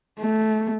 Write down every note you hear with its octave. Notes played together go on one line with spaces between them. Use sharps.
A3